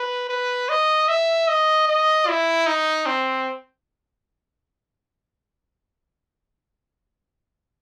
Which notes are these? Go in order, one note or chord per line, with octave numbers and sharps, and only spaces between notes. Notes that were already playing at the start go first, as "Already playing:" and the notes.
Already playing: B4
B4
D#5
E5
D#5
D#5
E4
D#4
C4